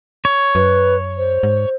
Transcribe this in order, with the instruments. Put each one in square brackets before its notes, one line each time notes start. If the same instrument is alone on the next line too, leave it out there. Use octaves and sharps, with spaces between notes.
[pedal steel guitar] C#5
[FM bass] F#2 [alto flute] B4
[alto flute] C5
[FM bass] G#2